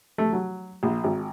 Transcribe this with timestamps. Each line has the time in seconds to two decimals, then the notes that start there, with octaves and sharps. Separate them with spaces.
0.18 A3
0.32 F#3
0.83 A#1
1.04 G#1